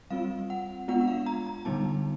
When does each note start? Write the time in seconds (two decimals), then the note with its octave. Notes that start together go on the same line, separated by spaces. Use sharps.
0.10 G3 C4 F4 F5
0.50 F#5
0.88 G#3 B3 D4 F4 F#5
1.01 F#5
1.07 F5
1.26 A#5
1.47 A#5
1.65 D3 G3 B3 D#4 A5